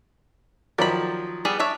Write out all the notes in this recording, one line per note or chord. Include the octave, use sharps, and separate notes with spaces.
D#3 F3 F#3 D5 B5
G3 B3 G#4
D4 C#5 E5